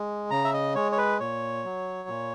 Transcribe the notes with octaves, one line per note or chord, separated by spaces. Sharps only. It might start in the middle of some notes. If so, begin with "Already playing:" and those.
Already playing: G#3
C#3 A#5
E5
D#5
G#3 C#5
C#5
B4
A#2 C#5
F#3
A#2